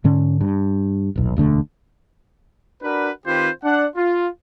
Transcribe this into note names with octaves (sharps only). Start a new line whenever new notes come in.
G#2 D3 C#4
G2
D#1 B1
E1 D2 D3 A3
D4 F#4 A#4 B4
D#3 C4 F4 G4 B4 C5
D4 F#5
F4